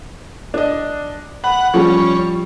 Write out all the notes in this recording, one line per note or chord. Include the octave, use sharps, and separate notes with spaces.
D4 D#5
F#5 B5
F3 G3 C#4